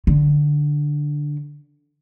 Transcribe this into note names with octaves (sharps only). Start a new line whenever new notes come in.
D3